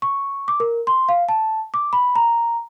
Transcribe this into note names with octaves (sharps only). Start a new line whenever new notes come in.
C#6
D6
A#4
C6
F5
A5
D6
B5
A#5